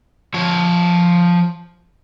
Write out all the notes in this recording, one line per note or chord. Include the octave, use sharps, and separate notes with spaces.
F3 C#5